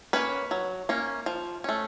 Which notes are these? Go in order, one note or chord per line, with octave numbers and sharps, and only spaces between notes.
A#3 C#4 B4
F#3
A#3 C#4
F3
A3 C#4